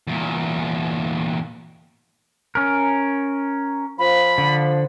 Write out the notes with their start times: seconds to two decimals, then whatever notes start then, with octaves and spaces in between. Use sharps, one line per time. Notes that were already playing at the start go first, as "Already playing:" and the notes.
0.07 E2 A#2
2.55 C#4 A#4
3.99 F3 B5
4.38 D3